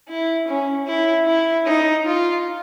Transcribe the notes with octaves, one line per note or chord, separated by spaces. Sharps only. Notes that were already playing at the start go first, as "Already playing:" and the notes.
E4
C#4
E4
E4
D#4
F4